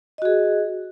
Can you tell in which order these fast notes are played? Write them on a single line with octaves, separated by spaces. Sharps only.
D#5 F#4 G#4